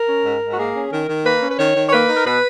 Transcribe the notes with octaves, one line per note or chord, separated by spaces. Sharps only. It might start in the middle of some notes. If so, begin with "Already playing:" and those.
Already playing: A#4
C#4
G#2
G#2
F#4
A#3 G#4
C#4
D#3 A#4
D#3
A#3 B4
C#4
B4
D#3 C#5
D#3
C#5
A#3 B4
D#4
A#4
B2 B4